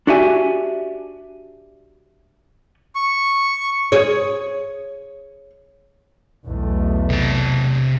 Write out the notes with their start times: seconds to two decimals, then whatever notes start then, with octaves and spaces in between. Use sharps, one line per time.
0.07 D4 F#4 G4 E5 G#5
2.95 C#6
3.92 G#4 C#5
6.46 B1 E2 A3
7.10 C3 A5